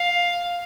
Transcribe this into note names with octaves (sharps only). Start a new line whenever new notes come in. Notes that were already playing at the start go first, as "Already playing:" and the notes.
Already playing: F5